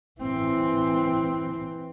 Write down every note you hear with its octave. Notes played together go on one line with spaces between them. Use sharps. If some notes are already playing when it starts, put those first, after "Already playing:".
E3 C4